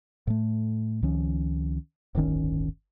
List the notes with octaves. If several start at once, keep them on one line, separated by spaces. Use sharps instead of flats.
A2 A3
C#2 D#3 F3 C#4
D1 G1 D#3 C#4